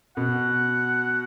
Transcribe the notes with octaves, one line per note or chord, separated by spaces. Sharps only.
B2 F#5